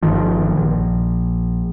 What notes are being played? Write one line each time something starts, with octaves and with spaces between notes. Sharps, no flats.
G1 D#3 F3
A#1